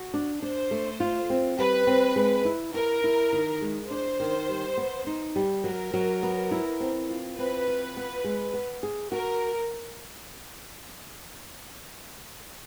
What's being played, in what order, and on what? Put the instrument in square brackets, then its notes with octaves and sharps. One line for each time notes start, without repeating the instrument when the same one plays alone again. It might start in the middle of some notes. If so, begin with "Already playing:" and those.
Already playing: [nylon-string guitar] F#4
D4
[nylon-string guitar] D4 [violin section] C5
[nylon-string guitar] A3
F4
C4
[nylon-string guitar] G3 [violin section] B4
[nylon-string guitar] C4
G#3
E4
[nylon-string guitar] E4 [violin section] A#4
[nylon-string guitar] E4
D#3
G#3
[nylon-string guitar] D4 [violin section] C5
[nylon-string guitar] D#3
G3
B3
D#4
G3
[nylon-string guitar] F#3 [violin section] A#4
[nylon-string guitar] F#3
B3
E4
C4
F4
[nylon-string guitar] C4 [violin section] B4
[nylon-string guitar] F4
B3
G#3
B3
G#4
[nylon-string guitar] F#4 [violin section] A#4